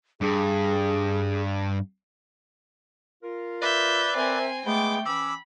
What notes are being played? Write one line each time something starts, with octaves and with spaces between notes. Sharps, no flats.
G2 G#4
F4 A#4
B4 D5 E5 G6
C4 A#4 C5 E5 G#5
G#3 A3 B3 G5 D6
E3 C#4 B5 D6 E6